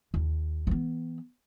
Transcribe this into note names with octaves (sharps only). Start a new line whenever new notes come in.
D#2
E3 B3